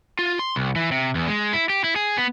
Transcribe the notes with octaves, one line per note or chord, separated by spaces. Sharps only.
F4
C6
C2
E3
C3
E2
G#3
E4
G4
E4
G#4
B3